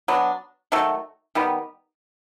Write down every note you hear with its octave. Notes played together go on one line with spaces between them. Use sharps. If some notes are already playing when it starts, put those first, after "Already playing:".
F#3 B3 D4
D#3 F#3 A3
D#3 G3 B3